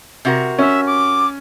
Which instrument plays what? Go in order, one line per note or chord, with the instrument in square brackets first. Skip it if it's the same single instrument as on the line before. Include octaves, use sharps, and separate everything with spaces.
[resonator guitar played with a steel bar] C3 F#4 A#4
[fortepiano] C#4 [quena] E5
[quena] D6